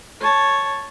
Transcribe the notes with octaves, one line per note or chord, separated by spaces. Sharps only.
C#5 A5